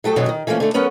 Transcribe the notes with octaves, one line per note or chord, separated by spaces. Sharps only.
F#3 A3 G4 A4
F#2 B2 D#3 E3 F#3
D#3
E3 F3 A3 A#3 C#4
D3 A3
F#3 B3 C#4 A#4 B4 F#5